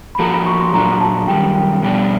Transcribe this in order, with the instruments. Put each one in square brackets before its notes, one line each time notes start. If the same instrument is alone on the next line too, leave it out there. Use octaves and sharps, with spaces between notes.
[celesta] B5
[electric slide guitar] F3 A#3 D#4 F#4 A4 [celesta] A#5
[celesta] B5
C#6
C6
[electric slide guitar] A#2 F#3 A#3 D4 F#4 [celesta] A#5
[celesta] A5
[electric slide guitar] F#2 D#3 G3 [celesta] G5
[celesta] G5
[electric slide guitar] B2 G3 B3 D4 [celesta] G5